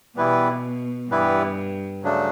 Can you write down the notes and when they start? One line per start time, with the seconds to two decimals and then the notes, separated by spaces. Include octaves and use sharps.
0.16 B2 E3 G3 B3 E4 B4
1.09 G2 E3 G3 B3 E4 B4
2.03 C#3 F#3 A3 D4